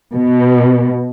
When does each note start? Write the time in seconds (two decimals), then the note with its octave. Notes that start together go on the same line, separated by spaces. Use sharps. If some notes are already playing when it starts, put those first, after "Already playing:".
0.14 B2